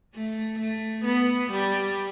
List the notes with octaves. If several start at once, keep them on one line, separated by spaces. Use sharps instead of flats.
A3
A3
B3
G3